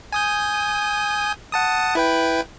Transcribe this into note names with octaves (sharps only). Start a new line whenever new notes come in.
G#5 D#6 G6
F#5 A5 D#6
E4 B4 G5